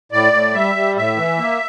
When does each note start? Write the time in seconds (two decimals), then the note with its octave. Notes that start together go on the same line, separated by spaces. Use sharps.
0.12 A2 D5
0.33 A2
0.54 G3 E5
0.75 G3
0.96 A2 E5
1.16 E3
1.38 A#3